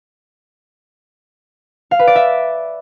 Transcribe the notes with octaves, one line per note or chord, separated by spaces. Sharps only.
F5
B4
D5
E5